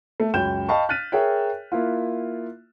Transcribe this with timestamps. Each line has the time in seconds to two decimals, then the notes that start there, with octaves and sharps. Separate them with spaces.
0.20 A3
0.34 C#2 F#2 G5 B5 G6 E7
0.69 D#5 F5 G5 A5 B5 C#6
0.89 F6 F#6 A6 B6 D#7
1.12 G#4 A#4 C#5 E5 G5
1.72 A#3 E4 F4